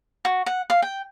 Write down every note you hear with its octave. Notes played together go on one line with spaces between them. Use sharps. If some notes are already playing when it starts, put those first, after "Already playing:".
F#4
F#5
F5
G5